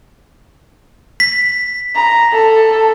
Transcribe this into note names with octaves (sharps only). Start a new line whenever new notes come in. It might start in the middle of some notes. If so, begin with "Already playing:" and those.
B6
A#5
A4